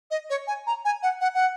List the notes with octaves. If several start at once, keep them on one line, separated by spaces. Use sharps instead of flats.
D#5
C#5
G#5
A#5
G#5
F#5
F#5
F#5